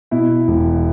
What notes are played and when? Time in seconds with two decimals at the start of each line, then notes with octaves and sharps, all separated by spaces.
0.11 B2 E4
0.48 E1